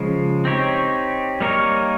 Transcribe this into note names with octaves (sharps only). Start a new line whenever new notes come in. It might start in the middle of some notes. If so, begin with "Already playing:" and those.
Already playing: C#3 F3 G#3
C4 D#4 G4 C#5
G3 A#3 D#4 A#4 C#5